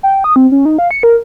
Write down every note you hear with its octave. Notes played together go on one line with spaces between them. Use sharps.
G5
D#6
C4
C#4
D#4
F5
C#7
A#4